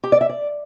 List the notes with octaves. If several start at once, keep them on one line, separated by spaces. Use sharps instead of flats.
G4
D5
E5
D5